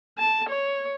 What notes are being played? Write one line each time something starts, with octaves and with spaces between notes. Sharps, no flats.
A5
C#5